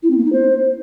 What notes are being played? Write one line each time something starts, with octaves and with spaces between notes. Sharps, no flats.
E4
C4
A#3
D#4
C5